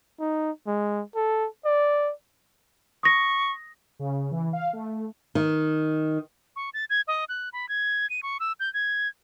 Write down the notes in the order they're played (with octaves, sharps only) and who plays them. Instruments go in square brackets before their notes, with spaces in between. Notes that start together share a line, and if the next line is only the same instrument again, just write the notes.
[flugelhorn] D#4
G#3
A4
D5
[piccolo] C#6 [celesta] D#6 A#6
[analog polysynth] C#3
E3
F5
A3
[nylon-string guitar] D#3
[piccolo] C#6
A6
G#6
D#5
F#6
B5
G#6
D#7
C#6
E6
G6
G#6